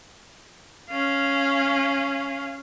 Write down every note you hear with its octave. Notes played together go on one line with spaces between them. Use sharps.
C#4 F5